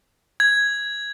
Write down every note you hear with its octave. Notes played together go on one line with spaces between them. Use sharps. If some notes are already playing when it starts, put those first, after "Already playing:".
G#6